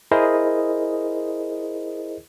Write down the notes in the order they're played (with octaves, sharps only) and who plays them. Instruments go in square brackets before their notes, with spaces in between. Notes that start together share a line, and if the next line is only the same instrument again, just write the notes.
[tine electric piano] E4 G#4 A#4 C5 D#5